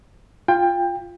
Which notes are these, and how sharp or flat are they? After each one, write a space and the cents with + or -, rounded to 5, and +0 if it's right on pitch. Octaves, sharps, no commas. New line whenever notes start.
F4 +0 G5 +25